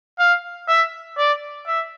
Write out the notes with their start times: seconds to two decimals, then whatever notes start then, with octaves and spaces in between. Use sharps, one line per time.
0.19 F5
0.68 E5
1.17 D5
1.66 E5